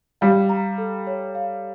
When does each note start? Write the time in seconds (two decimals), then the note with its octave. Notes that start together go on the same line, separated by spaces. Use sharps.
0.21 G3 F5
0.49 A#5
0.78 A4
1.07 C#5
1.35 F5